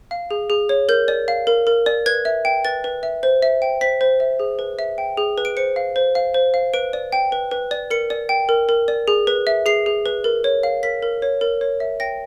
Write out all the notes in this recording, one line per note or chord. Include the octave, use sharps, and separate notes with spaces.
F5
G#4
G#4
C#5
A#4 G6
D5
F5
A#4
A#4
D5
B4 G#6
E5
G5
B4 A6
B4
E5
C5
E5
G5
C5 B6
C5
E5
G#4
B4
E5
G5
G#4
B4
D7
C5 C#7
F5
C5
F5
C5
F5
B4 D7
D5
G5
B4
B4
D5
A#4 C#7
D5
G5
A#4
A#4
D5
G#4
B4
E5
G#4 C7
G#4
B4
A#4
C#5
F5
A#4 B6
A#4
C#5
A#4
C#5
E5
G5 A#6